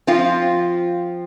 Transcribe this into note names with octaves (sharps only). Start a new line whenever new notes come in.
F3 C4 F4